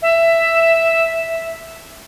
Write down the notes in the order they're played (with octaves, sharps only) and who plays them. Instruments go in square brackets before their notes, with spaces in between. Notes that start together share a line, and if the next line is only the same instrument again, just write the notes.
[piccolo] E5